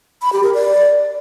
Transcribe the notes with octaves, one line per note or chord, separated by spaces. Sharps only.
B5
G4
A#4
D5